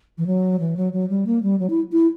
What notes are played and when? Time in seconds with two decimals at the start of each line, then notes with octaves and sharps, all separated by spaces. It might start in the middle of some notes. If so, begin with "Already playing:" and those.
0.18 E3
0.26 F#3
0.60 E3
0.77 F#3
0.93 F#3
1.09 G3
1.26 A#3
1.43 G3
1.59 F#3
1.70 E4
1.92 E4